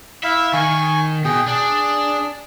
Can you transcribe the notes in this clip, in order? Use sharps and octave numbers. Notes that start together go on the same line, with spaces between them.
E4 E5 F5
D#3 G#5 C#6
B2 G#4 G5
D4 G#4